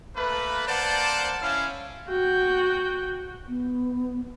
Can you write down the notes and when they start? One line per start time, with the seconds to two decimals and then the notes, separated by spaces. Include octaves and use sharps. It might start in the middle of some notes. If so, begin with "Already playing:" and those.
0.16 A3 A#3 B4
0.68 A#3 C5 D5 F#5 A5
1.42 C#4 E4 F5
2.09 F#4 G5
3.48 B3